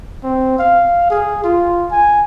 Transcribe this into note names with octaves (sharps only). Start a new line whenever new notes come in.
C4
F5
G#4
F4
G#5